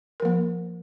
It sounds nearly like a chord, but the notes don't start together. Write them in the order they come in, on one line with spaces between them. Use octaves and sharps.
A#4 F3 A#3